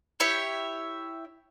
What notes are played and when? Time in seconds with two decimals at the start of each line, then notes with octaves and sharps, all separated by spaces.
0.20 E4 G4 C#5 E5